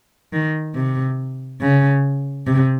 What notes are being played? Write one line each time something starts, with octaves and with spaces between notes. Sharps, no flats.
D#3
C3
C#3
C3